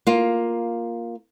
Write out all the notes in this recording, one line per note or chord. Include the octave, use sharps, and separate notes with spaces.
A#3 F4